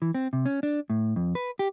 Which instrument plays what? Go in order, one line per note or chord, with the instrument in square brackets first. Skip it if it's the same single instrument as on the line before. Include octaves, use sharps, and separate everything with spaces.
[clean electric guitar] E3
C4
C3
C#4
D4
A2
F2
B4
G4